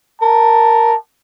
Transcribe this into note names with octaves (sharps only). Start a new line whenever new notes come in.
A#4 A5